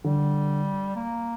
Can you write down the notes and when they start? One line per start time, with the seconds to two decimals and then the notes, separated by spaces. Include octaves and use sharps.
0.04 D3 G3
0.96 A#3